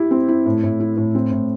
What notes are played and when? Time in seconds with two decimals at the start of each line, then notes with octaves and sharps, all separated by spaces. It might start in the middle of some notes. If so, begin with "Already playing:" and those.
Already playing: E4 G4
0.11 C4
0.28 E4
0.46 A2
0.63 A2
0.80 E4
0.97 A2
1.15 C4
1.31 A2